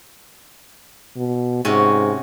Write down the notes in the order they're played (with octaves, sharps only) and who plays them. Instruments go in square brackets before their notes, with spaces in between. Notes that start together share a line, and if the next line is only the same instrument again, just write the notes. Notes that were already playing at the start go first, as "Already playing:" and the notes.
[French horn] B2
[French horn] G#2 [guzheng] C3 C#4 F#4